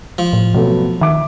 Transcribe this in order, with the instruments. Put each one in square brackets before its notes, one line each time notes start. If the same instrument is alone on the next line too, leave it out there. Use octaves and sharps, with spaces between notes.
[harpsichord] F3
[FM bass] A2
[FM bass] B2 [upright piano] F#3 A3 B3
[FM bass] D#3 [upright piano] E5 D6